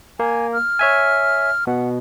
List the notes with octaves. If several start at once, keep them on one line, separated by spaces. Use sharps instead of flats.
A#3 G#5
F6
C#5 E5 G#5
B2 F#5